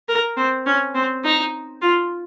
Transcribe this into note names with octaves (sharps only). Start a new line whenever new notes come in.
A#4
C4
C#4
C4
D#4
F4